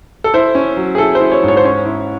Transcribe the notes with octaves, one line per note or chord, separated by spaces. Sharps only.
A4
E4 C5
C#4
F#3
G#4
E4 A4
C5
E4
C#5
G#2
C#5
C5
C#4 C#5
E4